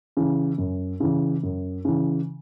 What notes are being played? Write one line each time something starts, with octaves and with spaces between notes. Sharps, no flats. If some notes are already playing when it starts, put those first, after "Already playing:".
C#3 E3
F#2
C#3 E3
F#2
C#3 E3